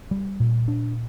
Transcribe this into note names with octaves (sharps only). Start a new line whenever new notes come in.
G3
A#2
D4